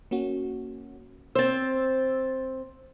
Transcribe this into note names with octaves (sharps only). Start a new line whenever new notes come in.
A#3 C#4 F#4
C4 C5 E6 A6